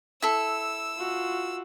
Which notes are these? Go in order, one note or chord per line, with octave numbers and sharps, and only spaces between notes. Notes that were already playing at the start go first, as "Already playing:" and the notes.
E4 A4 E6
F4 F#4